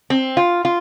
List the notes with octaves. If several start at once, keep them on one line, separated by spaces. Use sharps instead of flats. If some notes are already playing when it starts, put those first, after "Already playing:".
C4
F4
F4